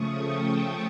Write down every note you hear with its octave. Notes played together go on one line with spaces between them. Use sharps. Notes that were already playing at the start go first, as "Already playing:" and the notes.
Already playing: C#3 F3 A3 C#6 D#6
G5 A5